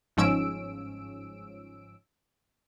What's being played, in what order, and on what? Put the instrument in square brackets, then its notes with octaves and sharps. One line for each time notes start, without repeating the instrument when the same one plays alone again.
[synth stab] G1 G#2 F3 C#4 E6 D7